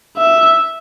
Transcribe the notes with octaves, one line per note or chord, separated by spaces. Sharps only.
E5